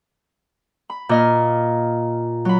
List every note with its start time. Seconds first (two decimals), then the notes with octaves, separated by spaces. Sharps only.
0.90 B5
1.09 A#2 D#5 F6
2.45 F#3 B5